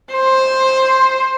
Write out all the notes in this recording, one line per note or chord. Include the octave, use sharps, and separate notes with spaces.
C5